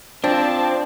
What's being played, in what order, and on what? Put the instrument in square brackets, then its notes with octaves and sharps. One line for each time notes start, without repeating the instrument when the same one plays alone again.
[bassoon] F3 [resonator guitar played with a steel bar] C4 [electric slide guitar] D4 [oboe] A5